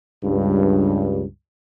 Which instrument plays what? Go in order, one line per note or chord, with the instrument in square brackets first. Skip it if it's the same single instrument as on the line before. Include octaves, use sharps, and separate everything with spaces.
[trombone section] C#2 G2